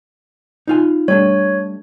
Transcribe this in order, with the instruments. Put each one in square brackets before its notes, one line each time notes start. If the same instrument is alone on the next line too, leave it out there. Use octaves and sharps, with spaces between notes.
[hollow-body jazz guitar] D#4 F4 G#5
[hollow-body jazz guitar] G3 A3 D4 [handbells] C#5